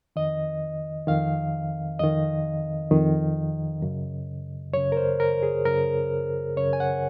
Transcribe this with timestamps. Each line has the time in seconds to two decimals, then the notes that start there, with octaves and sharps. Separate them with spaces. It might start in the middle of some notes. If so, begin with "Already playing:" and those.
0.16 F2 D#3 D#5
1.07 F2 D#3 F5
1.99 F2 D#3 D#5
2.91 F2 D#3
3.82 F#2 C#3
4.74 F#2 C#3 C#5
4.92 A#4
4.97 C5
5.20 A#4
5.43 G#4
5.65 F#2 C#3 A#4
6.57 F#2 C#3 C#5
6.73 G#5
6.80 F#5